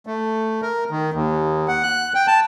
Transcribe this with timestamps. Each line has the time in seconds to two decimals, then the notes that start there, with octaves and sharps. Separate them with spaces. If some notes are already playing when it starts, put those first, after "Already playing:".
0.07 A3
0.62 A#4
0.91 D#3
1.14 D#2
1.68 F#5
1.83 F#6
2.15 G5
2.27 A5